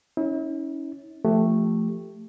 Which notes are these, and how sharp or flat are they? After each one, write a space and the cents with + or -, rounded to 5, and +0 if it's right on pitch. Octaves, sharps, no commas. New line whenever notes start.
C#4 +0 E4 -45
F3 -15 A3 +5 G4 +0